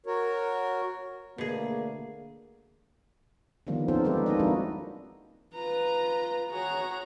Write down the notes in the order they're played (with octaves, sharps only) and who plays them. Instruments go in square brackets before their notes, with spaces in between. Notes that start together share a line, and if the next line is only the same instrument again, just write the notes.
[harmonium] F#4 A#4 C#5
[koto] B2 G#4 [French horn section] D3 A3 A#3
[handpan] D3 D#3 F3 G3 A#3 B3
C4 C#4 D#4 F4 A4 C5
G3 G#3 D#4 G4 A4 B4
A#3 D#4 A4 D#5
F3 G#3 C4 D4 E4 F#4
[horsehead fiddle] F4 B4 [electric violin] A#5
[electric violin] F#4 A#5 [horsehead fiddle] G#4 C#5